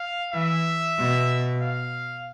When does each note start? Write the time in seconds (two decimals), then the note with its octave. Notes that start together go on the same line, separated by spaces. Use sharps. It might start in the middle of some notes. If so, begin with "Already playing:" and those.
Already playing: F5
0.33 E3 E5
0.97 B2
1.62 F5